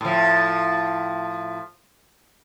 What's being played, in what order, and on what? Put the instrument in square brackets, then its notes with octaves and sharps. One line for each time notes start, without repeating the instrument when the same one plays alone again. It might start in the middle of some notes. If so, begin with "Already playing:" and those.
[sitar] A2 F3